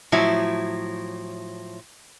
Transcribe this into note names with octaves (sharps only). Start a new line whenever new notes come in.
A2 F3 F#3 E4